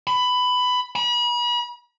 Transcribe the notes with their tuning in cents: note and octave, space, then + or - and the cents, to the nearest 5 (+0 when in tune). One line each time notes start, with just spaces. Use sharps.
B5 +15
B5 -40